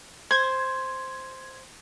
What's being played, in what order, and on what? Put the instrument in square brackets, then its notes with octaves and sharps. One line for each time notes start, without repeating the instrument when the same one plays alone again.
[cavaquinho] C5 [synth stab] G#6